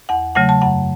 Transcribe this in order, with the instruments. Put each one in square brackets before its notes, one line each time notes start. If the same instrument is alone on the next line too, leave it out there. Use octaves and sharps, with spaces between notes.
[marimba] E2 F#5
C#3 F#3 A3 F#5
A5
F#2 F#5